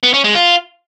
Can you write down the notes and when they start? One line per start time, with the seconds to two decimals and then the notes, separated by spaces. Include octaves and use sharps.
0.03 B3
0.14 C#4
0.24 G#3
0.35 F4